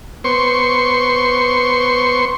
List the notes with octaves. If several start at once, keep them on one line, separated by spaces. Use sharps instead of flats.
B3 C5 C6 C#6